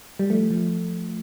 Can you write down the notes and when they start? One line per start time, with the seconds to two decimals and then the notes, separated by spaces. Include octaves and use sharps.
0.19 G3
0.30 F3 A3
0.51 F3